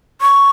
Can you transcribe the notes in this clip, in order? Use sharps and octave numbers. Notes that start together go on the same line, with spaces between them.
C#6